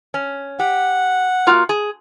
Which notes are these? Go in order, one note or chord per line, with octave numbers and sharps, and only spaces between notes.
C#4
G4 F#5
A#3 F4 F#4
G#4